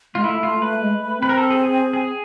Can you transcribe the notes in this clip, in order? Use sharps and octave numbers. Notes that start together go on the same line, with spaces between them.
G#3 F4
A3 E4
A3 F4
A3 B4
G#3
A3
C4 B4
A#4
A4
G#4
G#4
G#4